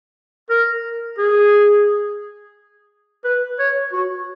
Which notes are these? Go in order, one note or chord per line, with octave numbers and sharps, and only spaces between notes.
A#4
G#4
B4
C#5
F#4